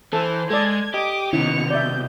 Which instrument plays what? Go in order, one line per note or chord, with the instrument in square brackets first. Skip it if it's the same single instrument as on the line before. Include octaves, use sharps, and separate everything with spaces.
[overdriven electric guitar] E3 [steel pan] A4 [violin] C5 [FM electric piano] A5
[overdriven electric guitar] G#3 [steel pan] A4 D5 [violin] G#6
[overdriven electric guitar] G4 [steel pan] D#5 [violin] D6 D#6
[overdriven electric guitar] C2 B2 [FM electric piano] D#3 C#4 E4 [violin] C#7 F7
[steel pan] D5 E5 [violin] G6